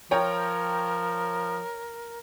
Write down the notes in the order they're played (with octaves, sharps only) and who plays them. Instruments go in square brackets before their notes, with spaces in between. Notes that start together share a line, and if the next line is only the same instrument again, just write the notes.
[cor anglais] F3 [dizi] A#4 [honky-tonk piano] C#5 G5 A#5